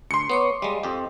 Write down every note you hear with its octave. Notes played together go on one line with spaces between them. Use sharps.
D2 C6 C#7
B3 C#5 C#6 D6
G3 G#3 D#5 F5
F2 G4